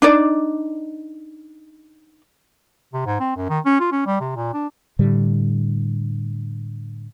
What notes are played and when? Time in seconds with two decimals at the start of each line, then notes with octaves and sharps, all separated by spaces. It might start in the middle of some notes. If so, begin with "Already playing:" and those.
0.02 D4 D#4 D5
2.94 C3
3.06 G#2
3.20 C4
3.36 F#2
3.49 D#3
3.66 C#4
3.80 F4
3.92 C#4
4.07 G3
4.20 C3
4.36 A#2
4.54 D4
4.99 A2 D3 G3